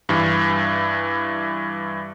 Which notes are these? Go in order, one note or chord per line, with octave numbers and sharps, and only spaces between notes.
G2 E3